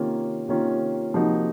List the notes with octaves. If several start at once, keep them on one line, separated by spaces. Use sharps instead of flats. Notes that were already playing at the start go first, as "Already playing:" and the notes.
Already playing: C3 D#3 A#3 C#4 F4
C3 D#3 A#3 C#4 F4
C3 F3 A#3 D#4 F#4